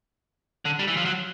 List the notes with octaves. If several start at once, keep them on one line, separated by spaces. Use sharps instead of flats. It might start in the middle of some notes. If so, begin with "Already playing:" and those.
D3
G3
E3
F3
F#3